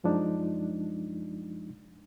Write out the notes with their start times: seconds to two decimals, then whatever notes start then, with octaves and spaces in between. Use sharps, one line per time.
0.04 F#2 F3 G#3 D4 D#4